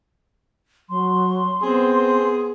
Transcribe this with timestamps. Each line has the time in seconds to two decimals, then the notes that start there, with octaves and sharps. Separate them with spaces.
0.89 F#3 C6
1.62 B3 C4 G#4